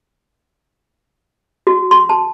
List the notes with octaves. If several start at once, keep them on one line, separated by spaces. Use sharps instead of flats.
F#4
C6
A5